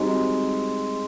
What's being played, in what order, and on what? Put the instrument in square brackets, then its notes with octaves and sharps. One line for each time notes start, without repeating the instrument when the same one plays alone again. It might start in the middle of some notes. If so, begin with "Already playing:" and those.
Already playing: [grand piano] G3 C4 D#4 F#4 [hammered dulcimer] G#3